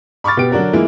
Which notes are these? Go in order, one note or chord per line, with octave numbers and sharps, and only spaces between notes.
B5 C#6 D6 F6 A6
B2 B3 G4 D7
D3 F#3 D4 F#4 A#4
E3 G#3 A#3 E4 F4